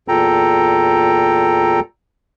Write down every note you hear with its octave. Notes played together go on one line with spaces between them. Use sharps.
E2 A#2 A4 G5 A#5